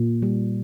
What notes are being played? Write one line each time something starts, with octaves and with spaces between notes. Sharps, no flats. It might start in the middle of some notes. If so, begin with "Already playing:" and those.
Already playing: A#2
G3